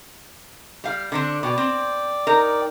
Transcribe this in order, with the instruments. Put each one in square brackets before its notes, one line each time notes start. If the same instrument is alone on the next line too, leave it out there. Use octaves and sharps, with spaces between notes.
[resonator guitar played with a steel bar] G3 F5
D3 C4 D4
[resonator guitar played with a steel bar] B2 [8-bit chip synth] D5 G5 D6
[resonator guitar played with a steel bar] C4
D#4 A#4